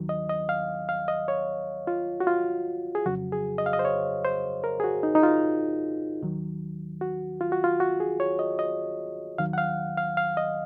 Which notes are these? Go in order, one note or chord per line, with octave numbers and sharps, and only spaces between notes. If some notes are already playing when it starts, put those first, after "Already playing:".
Already playing: D#2 D#3 F#3
D#5
D#5
F5
F5
D#5
C#5
F4
F#4
F4
G#4
F2 C#3 F#3 F#4
G#4
D#5
F5
D#5
C5
C#5
C5
A#4
G#4
F#4
D#4
D#4
F4
D#2 D#3 F#3
F#4
F4
F#4
F4
F#4
G#4
C#5
D#5
D#5
D#2 D#3 F#3 F5
F#5
F5
F5
F5
D#5